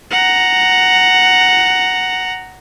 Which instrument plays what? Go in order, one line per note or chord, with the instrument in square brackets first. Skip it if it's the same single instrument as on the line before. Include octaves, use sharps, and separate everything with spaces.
[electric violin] F#5 A#5